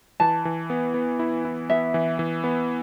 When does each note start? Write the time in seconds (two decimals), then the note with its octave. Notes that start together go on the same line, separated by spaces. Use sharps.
0.20 E3 A5
0.45 E3
0.70 B3
0.94 B3
1.19 E4
1.45 E4
1.69 B3 E5
1.94 E3
2.19 E3
2.44 B3